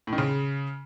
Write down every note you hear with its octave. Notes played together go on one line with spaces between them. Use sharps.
A2
D#3
C#3